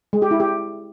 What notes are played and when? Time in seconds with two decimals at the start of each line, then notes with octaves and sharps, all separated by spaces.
0.13 G#3
0.22 G4
0.31 E4
0.40 G4